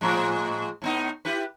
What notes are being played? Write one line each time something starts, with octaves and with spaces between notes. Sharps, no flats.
A2 F3 G#3
A2 B3 D#4
E4 G4 B4